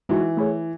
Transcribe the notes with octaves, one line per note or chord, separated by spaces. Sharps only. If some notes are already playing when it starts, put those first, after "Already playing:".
E3 G#3 D#4 F#4
A3 E4 G#4 C#5